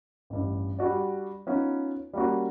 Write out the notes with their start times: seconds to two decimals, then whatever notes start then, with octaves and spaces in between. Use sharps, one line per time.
0.30 A1 G2
0.79 G3 D4 F#4 D5
1.47 B3 C#4 D#4 F4
2.13 G3 A#3 C#4 F#4